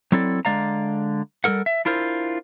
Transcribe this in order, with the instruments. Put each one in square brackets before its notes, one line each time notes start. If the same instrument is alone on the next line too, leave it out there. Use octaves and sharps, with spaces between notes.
[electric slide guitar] F#3 C4 E4 A4 D5
D3 G#3 D5 F5 A#5
G3 G#3 A4 A#4 F#5
E5
D4 E4 F4 A#4 C5